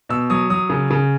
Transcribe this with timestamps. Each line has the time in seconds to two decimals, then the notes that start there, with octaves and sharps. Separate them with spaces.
0.09 B2 E6
0.30 F#3 D#6
0.50 F#3 D#6
0.70 C#3
0.91 C#3